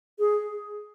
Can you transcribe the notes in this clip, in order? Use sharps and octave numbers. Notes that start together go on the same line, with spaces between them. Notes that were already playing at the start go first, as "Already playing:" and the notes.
G#4